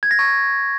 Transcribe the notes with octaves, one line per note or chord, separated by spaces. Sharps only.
G#6
A#6
C#6